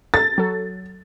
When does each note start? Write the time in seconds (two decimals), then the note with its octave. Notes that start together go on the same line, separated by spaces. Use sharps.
0.14 A4 A6
0.38 F#3 A4